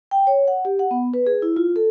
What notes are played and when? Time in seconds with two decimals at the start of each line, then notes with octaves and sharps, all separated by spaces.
0.11 G5
0.27 C#5
0.48 F#5
0.65 G4
0.79 F#5
0.91 B3
1.14 B4
1.26 G#4
1.42 E4
1.56 F4
1.76 A4